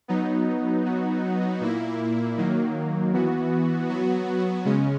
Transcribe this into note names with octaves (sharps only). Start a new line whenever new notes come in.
F#3 B3 D#4
F#3 B3 D#4 F#4
A#2 A#3 E4
D#3 F#3 A#3
E3 B3 F#4
F#3 B3 F#4
C#3 G#3 C#4